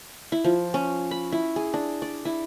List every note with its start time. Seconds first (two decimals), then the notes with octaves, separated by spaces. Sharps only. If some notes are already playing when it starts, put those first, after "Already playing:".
0.32 E4
0.44 F3
0.74 C#4
1.11 B5
1.32 E4
1.56 G#4
1.74 D4
2.02 D5
2.25 E4